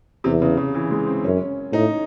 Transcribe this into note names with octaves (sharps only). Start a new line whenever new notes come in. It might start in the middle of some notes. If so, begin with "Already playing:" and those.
E2 C3
C#3
C#3
E3
G#3
C4
F#2 C#4
A2 D#4